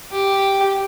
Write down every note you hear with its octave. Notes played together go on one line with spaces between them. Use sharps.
G4